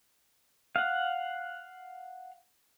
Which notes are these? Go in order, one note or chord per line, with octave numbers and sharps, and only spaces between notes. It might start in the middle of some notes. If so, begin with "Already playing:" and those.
F5 F#5